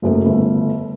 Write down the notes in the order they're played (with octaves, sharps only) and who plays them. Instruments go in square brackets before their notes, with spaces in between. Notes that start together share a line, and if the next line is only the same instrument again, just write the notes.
[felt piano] F#1 F#2 A3 A#4
G1 A3